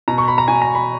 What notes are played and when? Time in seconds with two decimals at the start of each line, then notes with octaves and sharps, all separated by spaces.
0.08 B2 A#5
0.18 C#6
0.28 B5
0.38 A#5
0.48 B2 G#5
0.62 A#5
0.75 B5